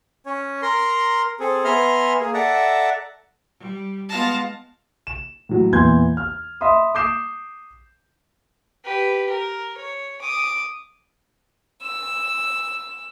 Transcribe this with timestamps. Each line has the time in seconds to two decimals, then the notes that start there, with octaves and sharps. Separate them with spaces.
0.26 C#4 C#5
0.62 A#4 A#5 C6
1.40 C4 G#4 A4
1.64 B3 E5 G#5 A#5 C6 F6
2.21 A#3 G#4
2.34 A4 D5 E5 F#5 A5 A#5
3.59 G3
4.08 G#3 B3 F4 F5 A5 A#6
5.07 E7
5.49 A2 F#3
5.72 E2 A#2 E3 C6 G6 G#6
6.17 F6
6.61 D#5 E5 B5 C6 D#6
6.95 D6 D#6 G6 C7 E7
8.85 G4 B4
9.30 A#4
9.78 C#5
10.22 D6 D#6
11.81 E6